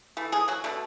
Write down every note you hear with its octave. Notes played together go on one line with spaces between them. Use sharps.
E3 A3
G#3 G#4
F#3 F#4
B2 D3 A3 D4